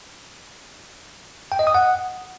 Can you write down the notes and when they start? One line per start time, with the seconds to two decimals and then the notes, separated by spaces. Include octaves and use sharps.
1.52 G5
1.59 D#5
1.67 D#6
1.75 F#5